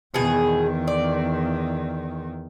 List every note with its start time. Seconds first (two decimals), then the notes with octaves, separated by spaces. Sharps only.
0.14 E2 B2 D#3 G#4
0.88 D5